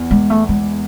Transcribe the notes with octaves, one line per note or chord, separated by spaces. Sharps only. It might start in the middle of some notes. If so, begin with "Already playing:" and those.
Already playing: E2
G#3
A3
G#3